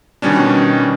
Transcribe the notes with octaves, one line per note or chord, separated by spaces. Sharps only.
B2 D#3 G3 C#4 D4